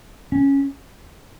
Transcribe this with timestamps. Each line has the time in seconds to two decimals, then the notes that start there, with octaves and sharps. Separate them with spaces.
0.32 C#4